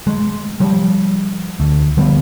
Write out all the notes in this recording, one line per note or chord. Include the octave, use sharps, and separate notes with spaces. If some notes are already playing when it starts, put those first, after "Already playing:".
G#3
F3 G3
D2
D3 F3 G3 B3